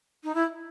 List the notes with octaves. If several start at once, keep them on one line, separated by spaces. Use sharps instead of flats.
D#4
E4